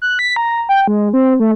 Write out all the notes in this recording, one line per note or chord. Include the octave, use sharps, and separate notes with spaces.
F#6
B6
A#5
G5
G#3
C4
A3